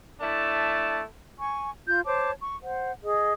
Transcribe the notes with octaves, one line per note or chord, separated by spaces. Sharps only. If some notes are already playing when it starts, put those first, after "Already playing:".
A3 D4 E4 A5
G#5 C#6
F4 G6
C5 C#5 A5 D6
C#6
C5 F#5
G#4 D#5